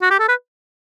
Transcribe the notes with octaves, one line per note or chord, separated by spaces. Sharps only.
F#4
G4
A4
B4